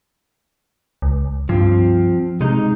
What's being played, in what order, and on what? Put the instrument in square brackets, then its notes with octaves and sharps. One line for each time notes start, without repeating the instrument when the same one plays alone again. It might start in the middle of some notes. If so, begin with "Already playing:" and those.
[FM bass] C#2
[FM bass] G2 [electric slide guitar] F3 C4
[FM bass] C3 [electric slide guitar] G#3 D#4